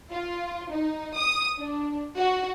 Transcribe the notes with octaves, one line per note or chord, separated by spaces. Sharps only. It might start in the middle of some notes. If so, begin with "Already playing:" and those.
F4
D#4
D#6
D4
F#4